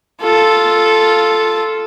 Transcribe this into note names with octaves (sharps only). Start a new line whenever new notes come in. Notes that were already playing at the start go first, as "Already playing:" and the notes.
F4 A4